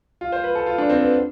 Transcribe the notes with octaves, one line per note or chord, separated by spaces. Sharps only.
F4
C5
B4
A4
F4
D4
C4
B3